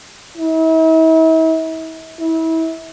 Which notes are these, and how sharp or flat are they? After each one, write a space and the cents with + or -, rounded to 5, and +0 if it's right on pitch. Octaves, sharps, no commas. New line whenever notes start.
E4 -40
E4 -30